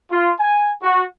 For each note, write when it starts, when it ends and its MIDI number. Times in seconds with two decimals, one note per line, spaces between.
0.11 0.31 65
0.39 0.71 80
0.82 1.03 66